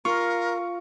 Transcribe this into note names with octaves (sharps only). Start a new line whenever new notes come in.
F4 A#4 C#6